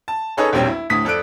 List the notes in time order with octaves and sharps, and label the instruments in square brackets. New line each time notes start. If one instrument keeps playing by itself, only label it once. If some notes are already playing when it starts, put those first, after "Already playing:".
[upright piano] A5
C#4 D#4 G#4 A4 B4 C#5
E1 A#1 G3 C4 C#4 G5
E4
D2 A2 D#6 B6
F2 A4 D5 F#6 D7